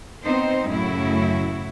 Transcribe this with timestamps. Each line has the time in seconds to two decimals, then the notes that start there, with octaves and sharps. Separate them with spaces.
0.25 B3 C4 D#4 C5
0.70 F#2 A2 C#3 E4 F#4